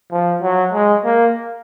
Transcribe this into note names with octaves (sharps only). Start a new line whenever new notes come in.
F3
F#3
G#3
A#3